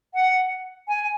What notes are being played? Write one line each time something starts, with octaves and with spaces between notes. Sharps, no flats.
F#5
G#5